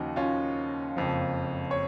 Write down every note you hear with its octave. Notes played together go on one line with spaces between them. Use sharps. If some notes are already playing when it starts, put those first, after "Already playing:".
Already playing: D#2 C#3 F3 D#4 F#4
C#4 F4
F#1 F2 F3
C#5